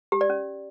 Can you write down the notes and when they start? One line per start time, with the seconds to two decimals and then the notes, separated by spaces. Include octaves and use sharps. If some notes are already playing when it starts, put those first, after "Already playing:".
0.12 G4
0.21 D5
0.30 C#4